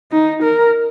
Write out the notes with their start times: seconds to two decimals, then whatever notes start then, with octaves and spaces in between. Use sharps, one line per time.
0.12 D#4
0.43 A#4